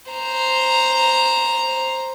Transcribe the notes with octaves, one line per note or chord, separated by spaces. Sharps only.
C5 A#5